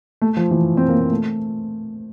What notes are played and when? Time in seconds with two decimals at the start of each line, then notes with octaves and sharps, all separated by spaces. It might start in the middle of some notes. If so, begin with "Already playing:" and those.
0.22 A3
0.37 F3
0.51 E3
0.77 C4
0.88 A#3
1.00 A#3
1.11 A3